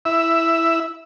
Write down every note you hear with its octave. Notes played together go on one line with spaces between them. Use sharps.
E4 E5